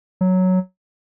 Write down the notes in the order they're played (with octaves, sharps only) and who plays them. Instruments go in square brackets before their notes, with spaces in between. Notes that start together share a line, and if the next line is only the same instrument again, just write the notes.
[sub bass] F#3